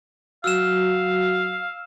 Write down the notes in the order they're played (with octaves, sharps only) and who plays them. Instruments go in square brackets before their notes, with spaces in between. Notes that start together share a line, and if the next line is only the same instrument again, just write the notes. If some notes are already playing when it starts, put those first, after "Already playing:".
[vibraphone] F#3 F#4 [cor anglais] F5 [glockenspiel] E6 F6 E7